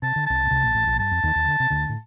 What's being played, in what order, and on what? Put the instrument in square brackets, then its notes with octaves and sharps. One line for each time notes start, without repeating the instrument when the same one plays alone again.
[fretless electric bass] C3 [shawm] A5
[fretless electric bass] D3
[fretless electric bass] C2 C3 [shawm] A5
[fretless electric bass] A#2
C2 C3
A#1 A#2
A1 A2
A#1 A#2
[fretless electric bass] G2 [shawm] A5
[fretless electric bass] F2
D#2 D#3
D#2 D#3
D3
C3
D2 D3
A2